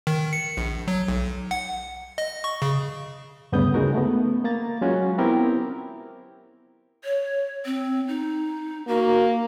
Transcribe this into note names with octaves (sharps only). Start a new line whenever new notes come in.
D#3
C#7
A#1
F#3
B1
F#5
D#5
C#6
C#3
D2 G2 C#3 B3 D#6 G6
C#3 G#3 D#4 F#4 A#4
A3 B3
A#3 A#5 A6
F#3 G#3 C#4 F4 F#4
B3 C4 E4 G4 A#4
C#5
C4
D#4
A#3 F#4